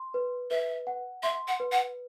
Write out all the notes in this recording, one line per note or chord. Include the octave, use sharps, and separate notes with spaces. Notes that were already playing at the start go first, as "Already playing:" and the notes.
Already playing: C6
B4
B4 E5
F#5
E5 C6
F#5
B4
F#5